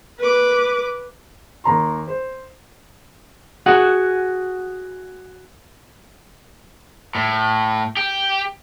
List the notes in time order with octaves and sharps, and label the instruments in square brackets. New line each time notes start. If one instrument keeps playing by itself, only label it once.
[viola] B4 D6
[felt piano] D#2 A#5 C6
C5
[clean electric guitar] F#4 G#4 F#5
[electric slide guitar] A2
G4